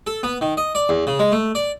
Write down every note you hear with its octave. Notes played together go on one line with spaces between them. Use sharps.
A4
B3
D#3
D#5
D5
E2
C#3
G#3
A3
D5